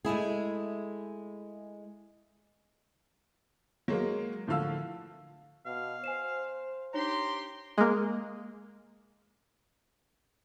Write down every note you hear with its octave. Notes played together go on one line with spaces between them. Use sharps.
G#3 A3 E4 G#4
F#3 G#3 A#3
A2 D3 F3 F5 E6
B2 F5
C5 G#5 C7 E7
D4 D#4 G4 C#5 A#5 C6
G#3 A#3